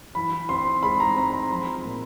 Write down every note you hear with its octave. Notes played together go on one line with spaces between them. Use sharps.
E3 B5
C4 C6
G#3 B5
A#5
C4 A#5
C6
F3 B5
A#2